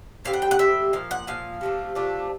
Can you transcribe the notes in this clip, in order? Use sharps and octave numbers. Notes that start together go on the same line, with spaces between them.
D3 G3 C4 F5
F#5
G5
F#5
D3 G3 C4 E5
A#2 F3 F5
F#5
A#2 F3 F5
C3 F3 A3 D4
C3 F3 A3 D4